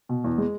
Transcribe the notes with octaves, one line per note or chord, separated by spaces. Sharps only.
B2
E2
G#3